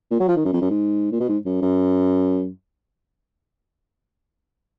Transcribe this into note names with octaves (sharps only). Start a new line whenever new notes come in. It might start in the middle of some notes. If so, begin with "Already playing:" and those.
A#2
F#3
F3
D#3
F#2
F2
F#2
G#2
A#2
B2
G#2
F#2
F#2